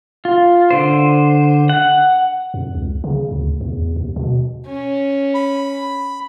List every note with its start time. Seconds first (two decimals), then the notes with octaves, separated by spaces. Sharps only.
0.25 F4
0.70 D3 C5
1.69 F#5
2.54 F2
2.75 C#2
3.04 C#3
3.31 D2
3.61 E2
3.96 D#2
4.16 B2
4.67 C#4
5.34 B5